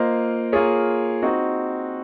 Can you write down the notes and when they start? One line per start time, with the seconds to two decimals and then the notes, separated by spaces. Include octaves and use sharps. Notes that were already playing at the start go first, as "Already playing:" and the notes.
Already playing: A#3 F4 C5 D#5
0.52 A#3 F4 G#4 C#5
1.22 C4 D#4 F#4